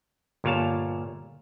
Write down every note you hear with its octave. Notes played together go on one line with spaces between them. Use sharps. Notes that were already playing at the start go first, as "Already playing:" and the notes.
G1 A#2 C#5 F5 A5